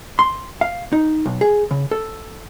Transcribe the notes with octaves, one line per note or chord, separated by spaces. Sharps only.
C6
F5
D#4
B1
G#4
C#3
A4